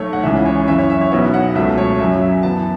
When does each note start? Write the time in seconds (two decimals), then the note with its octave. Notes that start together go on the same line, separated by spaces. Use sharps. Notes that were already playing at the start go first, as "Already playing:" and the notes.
Already playing: B1 A3 C#5
0.13 F#5
0.23 C#2 C#3 E3 E5
0.46 C#5
0.68 F#2 E3 C#4 E5
0.78 C#5
0.90 E5
1.01 C#5
1.12 B1 B2 B3 E5
1.34 F#5
1.55 C#2 B2 F#3 A3 E5
1.78 C#5
2.00 F#2 C#3 F#3 E5
2.22 E5
2.43 F#2 E3 B3 A5